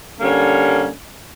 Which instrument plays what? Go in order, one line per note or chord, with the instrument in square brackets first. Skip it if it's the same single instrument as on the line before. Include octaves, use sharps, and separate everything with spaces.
[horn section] D3 G3 A#3 C#4